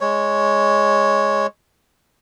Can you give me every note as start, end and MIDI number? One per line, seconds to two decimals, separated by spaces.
0.01 1.47 56
0.01 1.47 73